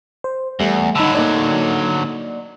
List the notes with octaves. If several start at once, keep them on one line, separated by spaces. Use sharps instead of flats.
C5
E2 G3 A3
D3 F#3 D#4 B5 E6
A#3 D#4 D5